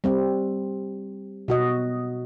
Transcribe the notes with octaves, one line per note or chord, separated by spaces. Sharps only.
G3 C4
B2 F#4 D#5